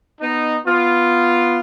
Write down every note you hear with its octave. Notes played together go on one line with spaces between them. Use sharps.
B3 D#4
B3 F4